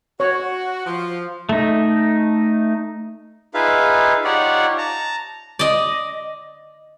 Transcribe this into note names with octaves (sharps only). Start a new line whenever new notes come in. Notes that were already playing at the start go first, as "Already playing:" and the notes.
F#4 C#5
F3
A3 D#4
D#4 F4 G#4 B4 E5 F5
D#4 F4 G4 C#5 D5 F#5
A5 A#5
D5 D#5